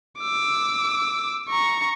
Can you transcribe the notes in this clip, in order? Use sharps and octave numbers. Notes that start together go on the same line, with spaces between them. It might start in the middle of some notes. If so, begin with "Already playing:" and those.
D6 E6
A#5 C#6